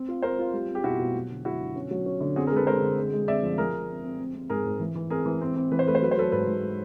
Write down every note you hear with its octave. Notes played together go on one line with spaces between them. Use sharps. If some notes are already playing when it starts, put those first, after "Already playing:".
Already playing: C4
F4
C4 A#4 C5
F4
G3
C4
G4
B2 E4 F#4
B2
F#3
D3
F#3 E4 F#4
D3
C#4
F#3
C#4
D3
C4 F#4 G#4
G#4 A#4
G#3
A4 B4
G#3 A#4 C5
D3
G#3
G#3
C4 D5 E5
F3
F3 G#4 A#4
F3
C4
C4
C4
C4
G#2 G#4 A#4
G#2
E3
E3
C4 G#4 A#4
E3
C4
C4
E3 B4
C5
A3 B4
C5
F#3 B4
C5
F#3 A4 B4
G#2 A4 B4
G#2